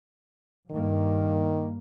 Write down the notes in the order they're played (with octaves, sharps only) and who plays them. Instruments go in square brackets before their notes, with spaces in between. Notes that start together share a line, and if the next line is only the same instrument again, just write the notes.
[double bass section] G2 A#3 [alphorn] D#3